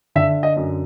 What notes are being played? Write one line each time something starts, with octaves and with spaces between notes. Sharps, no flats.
D3 E5
D#5
F#2